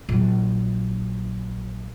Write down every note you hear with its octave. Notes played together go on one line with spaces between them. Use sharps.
A#1 F#3